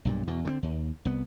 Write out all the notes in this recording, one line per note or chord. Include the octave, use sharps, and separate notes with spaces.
B1 G2 A#2
E2 B2
D3 G3 C4
D#2
C2 B3